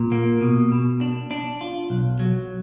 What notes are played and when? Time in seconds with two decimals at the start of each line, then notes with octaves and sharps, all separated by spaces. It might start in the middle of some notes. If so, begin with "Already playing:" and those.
Already playing: A#2
0.12 A#3
0.41 B2
0.72 B2
1.01 D4
1.31 D4
1.61 F4
1.90 B1
2.19 F#3